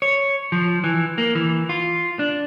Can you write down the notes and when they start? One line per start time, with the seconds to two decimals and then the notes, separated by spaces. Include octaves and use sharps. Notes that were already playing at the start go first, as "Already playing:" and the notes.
0.02 C#5
0.52 F3
0.84 E3
1.18 A#3
1.35 E3
1.69 F4
2.19 D4